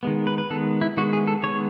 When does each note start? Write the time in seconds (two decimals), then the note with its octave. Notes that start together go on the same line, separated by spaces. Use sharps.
0.03 D#3 G#3 B3
0.27 B4
0.38 B4
0.50 D#3 G#3 B3 A4
0.81 E4
0.97 D#3 G#3 B3 F#4
1.13 G#4
1.27 A4
1.43 D#3 G#3 B3 C#5